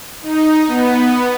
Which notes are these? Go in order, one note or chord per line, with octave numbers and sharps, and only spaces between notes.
D#4
B3